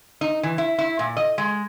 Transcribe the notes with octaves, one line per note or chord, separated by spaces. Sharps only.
D#4
E3
E4
E4
A#2
D#5
G#3